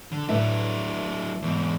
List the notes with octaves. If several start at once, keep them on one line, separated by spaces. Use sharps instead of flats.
D3
A2 F#3 D4 B4 E5
E2 G#2